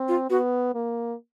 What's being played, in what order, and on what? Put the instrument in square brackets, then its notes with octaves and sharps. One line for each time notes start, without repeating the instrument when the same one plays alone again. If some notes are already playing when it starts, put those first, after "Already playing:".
Already playing: [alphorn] C4
[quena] F4
[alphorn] B3 [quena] F#4
[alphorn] A#3